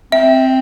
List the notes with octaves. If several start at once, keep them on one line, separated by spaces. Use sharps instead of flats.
C4 E5